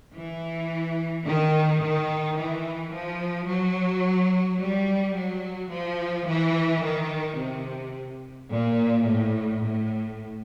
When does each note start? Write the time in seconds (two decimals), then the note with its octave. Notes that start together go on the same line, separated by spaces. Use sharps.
0.13 E3
1.24 D#3
1.80 D#3
2.36 E3
2.92 F3
3.47 F#3
4.59 G3
5.14 F#3
5.70 F3
6.26 E3
6.83 D#3
7.37 C3
8.49 A#2
9.05 A2
9.61 A2